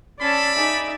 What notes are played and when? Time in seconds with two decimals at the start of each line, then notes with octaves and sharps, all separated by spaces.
0.21 C#4 D5 A5 B5 C6 E6
0.55 D#4 G#4 E5 D6